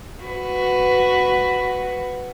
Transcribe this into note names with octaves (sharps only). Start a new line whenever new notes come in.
F#4 B4